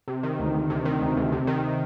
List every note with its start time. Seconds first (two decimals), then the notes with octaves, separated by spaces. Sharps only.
0.08 C3
0.23 D#3
0.39 D2
0.54 D2
0.70 C3
0.85 D#3
1.01 D2
1.17 D2
1.32 C3
1.47 D#3